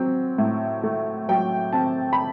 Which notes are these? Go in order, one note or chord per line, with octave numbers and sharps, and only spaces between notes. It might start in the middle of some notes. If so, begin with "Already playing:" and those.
Already playing: F#3 C4
A2
A3
F#3 G5
C4 A5
B5